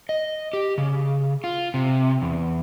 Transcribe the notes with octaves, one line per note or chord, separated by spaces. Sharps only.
D#5
G4
C#3
F4
C3
E2